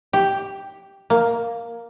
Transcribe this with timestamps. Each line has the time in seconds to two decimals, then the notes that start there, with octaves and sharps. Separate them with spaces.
0.13 G4
1.10 A#3